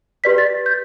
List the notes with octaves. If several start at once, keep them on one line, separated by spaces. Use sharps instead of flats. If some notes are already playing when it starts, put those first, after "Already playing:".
G4 B4 D5 B6
A6
G6